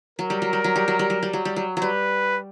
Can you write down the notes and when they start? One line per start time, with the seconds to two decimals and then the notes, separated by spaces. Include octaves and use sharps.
0.19 F#3 A#4
0.30 G3
0.42 F#3
0.53 G3
0.64 F#3
0.76 G3
0.88 F#3
0.99 G3
1.10 F#3
1.23 G3
1.33 F#3
1.45 G3
1.56 F#3
1.77 F#3
1.82 G3 B4